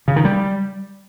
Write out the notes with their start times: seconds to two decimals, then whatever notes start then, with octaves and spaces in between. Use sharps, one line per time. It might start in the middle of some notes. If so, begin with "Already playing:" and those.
0.08 C#3
0.16 D#3
0.25 G3